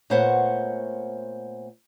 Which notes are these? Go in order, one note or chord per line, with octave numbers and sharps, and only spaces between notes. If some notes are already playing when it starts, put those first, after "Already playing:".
A#2 A3 B3 C5 C#5 F#5